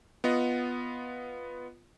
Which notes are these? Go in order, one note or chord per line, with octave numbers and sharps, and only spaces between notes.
B3 F4 D#5 F#5